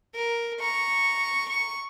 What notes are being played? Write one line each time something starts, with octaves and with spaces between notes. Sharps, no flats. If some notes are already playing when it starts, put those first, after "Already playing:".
A#4
A#5 C#6
C#6